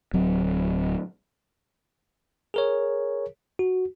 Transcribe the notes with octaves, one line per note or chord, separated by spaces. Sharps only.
D1 F#3 C4
G#4 A#4 C#5
F#4